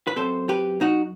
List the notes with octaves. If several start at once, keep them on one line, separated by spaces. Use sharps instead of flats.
B4
F#2 F#3 C4 A4 C5
G4 B4
D#4 F#4